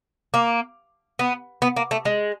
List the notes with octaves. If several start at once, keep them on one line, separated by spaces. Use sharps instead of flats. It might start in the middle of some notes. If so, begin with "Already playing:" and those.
A#3
B3
B3
A#3
A3
G#3